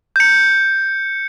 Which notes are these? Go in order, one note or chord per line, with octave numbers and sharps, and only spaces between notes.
G6 C#7